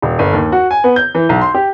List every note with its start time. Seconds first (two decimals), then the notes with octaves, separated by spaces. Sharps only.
0.02 D#1
0.19 G1
0.33 D#2
0.52 F#4
0.71 G#5
0.84 B3
0.96 G6
1.15 E3
1.29 B1
1.41 C6
1.55 G4